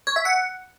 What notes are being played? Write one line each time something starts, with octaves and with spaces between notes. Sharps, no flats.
C#5
E5
F#5